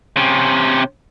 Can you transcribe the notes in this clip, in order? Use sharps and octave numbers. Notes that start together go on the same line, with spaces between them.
C3 C#4